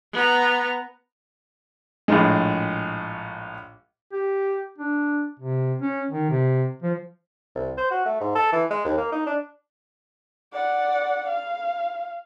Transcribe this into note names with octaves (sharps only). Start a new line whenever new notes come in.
B3 A#5
A#1 A2 G#3
G4
D4
C3
C#4
D#3
C3
F3
C2
C5
F#4
A3
G#2
A4
E3
G#3
D#2
A#3
D#4
D4
D5 F#5
F5